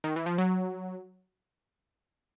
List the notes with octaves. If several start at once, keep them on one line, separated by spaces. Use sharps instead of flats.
D#3
E3
F3
F#3